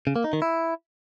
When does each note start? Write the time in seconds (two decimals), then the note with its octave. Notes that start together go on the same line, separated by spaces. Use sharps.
0.07 C#3
0.16 A#3
0.24 D#4
0.33 D#3
0.42 E4